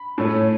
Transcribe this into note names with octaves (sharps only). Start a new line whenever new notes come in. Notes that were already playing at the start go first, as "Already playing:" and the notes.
Already playing: B5
A2 A3 C#4